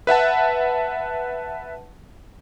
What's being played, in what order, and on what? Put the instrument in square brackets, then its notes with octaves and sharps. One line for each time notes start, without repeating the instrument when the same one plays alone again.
[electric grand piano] B4 E5 F#5 A5